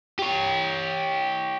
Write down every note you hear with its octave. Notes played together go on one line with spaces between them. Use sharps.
G4 C#5